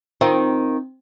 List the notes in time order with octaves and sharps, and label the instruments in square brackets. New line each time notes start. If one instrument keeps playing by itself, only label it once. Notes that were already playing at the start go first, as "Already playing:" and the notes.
[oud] D#3 F4 [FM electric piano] C4